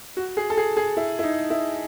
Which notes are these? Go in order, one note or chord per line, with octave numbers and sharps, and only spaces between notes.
F#4
G#4
A4
G#4
G#4
E4
E4
D#4
E4